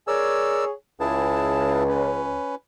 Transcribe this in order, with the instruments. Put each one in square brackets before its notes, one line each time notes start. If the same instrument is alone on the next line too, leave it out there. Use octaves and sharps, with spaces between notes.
[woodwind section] G#4 C#5 [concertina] A#4 D5 E6
[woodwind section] C#2 [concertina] E4 G#4 A5
[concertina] C#4 B4